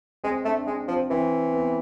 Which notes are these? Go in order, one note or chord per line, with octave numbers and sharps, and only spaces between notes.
G#3 C4
A3 D4
G#3 D4
F3 C4
E3 C4
B3